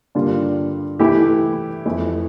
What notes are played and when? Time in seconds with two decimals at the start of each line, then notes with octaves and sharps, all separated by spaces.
0.15 G2 D3 G3 A#3 F4
0.99 E3 A3 E4 G4
1.85 F2 E3 A3 E4